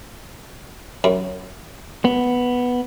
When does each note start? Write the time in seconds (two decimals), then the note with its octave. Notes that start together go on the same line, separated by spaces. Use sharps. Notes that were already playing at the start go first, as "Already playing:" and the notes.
1.04 F#2
2.05 B3